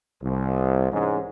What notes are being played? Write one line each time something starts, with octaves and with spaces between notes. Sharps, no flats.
C2
G#2 E3 G#3 C#4